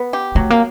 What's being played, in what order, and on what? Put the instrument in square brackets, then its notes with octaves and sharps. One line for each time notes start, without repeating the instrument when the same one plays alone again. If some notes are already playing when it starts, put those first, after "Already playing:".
Already playing: [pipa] B3
G4
[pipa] F#3 [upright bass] A3
[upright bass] A#3